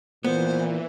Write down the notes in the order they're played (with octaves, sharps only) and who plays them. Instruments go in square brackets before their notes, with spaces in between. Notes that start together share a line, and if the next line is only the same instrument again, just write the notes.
[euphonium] A#2 [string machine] E3 [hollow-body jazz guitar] B3 [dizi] C5